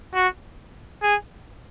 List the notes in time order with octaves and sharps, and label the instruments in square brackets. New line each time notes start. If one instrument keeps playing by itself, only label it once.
[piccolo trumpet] F#4
G#4